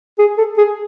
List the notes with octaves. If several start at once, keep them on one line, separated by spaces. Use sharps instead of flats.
G#4
A4
G#4